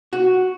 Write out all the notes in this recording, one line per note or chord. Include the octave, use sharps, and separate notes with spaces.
F#4